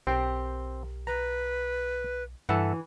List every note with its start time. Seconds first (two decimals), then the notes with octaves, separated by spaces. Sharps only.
0.07 B1 C4 G4 A#4 G5
1.07 B4 A#5
2.49 G2 E3 A4 E5 F#5